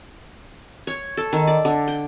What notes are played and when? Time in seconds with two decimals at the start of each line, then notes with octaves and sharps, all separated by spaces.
0.87 C#5
1.17 A4
1.33 D#3
1.47 D5
1.65 D3
1.88 G5